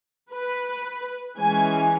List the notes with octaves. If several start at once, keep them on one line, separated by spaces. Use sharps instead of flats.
B4
E3 G#3 C#4 G#5